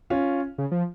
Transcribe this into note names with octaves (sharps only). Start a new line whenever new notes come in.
C#4 F4
C#3
F3